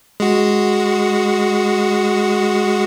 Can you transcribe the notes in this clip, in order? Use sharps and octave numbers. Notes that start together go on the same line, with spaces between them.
G#3 F#4